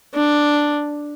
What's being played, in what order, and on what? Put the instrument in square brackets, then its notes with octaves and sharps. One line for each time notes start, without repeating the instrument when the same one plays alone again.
[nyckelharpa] D4